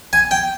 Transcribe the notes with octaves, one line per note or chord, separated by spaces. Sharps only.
G#5
G5